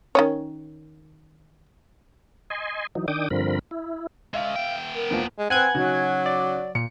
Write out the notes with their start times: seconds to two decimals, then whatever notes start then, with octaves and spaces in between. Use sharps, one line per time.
0.15 D#3 C#4 C#5
2.50 D#5 G#5 C6
2.95 E3 F#3 D#4
3.08 D#3 D4 G5 D6 D#6
3.30 G2 D3 F3 C4 A#4 B5
3.71 E4
4.34 G#3 C#4 E5 F5
4.56 B3 G5
4.95 A#4
5.11 E2 F3 A#3
5.38 G#3
5.50 C4 B4 F#5 G#5 F#6 G#6
5.75 C#3 F#3 D#4 F#4
6.26 D5
6.75 A#2 C#7